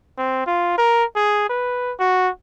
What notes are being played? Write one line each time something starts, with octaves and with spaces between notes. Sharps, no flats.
C4
F4
A#4
G#4
B4
F#4